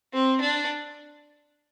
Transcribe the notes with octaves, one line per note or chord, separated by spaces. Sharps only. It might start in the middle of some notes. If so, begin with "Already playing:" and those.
C4
D4